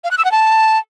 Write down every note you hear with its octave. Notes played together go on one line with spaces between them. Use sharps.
F5
F#6
E6
F#5
A5